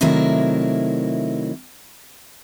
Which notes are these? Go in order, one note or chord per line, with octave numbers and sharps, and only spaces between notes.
C3 D#3 F#3 A3 E4 A#4